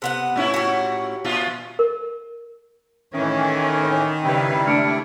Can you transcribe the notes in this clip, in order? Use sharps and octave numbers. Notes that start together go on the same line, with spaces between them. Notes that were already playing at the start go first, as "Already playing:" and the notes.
C3 B3 F#5
A2 C#4 E4
F#4 G4
A#2 F4
A#4
A2 D#3 E3 C#4 E5
C#3 G3 E4 B4 G5
A3 D4 F6 C#7 D7